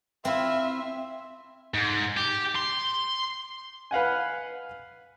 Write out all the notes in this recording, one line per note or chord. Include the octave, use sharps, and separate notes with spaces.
C4 E4 F4 E5
G#2
G4
C6
B4 F5 F#5 G#5